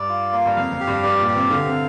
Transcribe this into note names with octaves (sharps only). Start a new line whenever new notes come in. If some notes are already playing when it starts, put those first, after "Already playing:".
Already playing: G2 D5
F4
A#3
G2
F2 F5
F2
G4
G2
G2 D5
A#2
G4
C3
D3 F5
C3